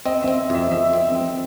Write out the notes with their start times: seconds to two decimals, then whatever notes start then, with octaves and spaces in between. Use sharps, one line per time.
0.05 C4 D#5
0.22 E5
0.28 C4
0.50 F2 E5
0.71 F2 E5
0.93 C4
1.15 C4